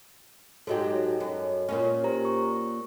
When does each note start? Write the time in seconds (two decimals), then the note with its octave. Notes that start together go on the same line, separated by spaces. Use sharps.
0.67 G#2 F#3 G4 A4 D#5
1.20 F#2
1.69 A#2 A#3 C#4
2.03 G4 C5 A#5
2.25 C#6